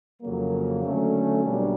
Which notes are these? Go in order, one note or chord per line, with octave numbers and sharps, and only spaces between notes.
F2 C#3 F#3 A#3
D3 F#3 A3 C#4
B1 B2 G3 A#3 D4